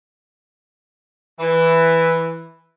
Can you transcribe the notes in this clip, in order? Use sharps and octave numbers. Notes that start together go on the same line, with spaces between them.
E3